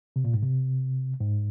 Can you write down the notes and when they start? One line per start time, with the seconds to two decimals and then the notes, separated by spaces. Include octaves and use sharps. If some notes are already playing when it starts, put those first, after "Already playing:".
0.16 C3
0.25 A#2
0.34 G#2
0.42 C3
1.20 G#2